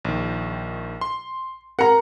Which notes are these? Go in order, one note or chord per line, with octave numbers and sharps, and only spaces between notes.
A#1 D#3
C6
A#4 F#5 A#5 C#7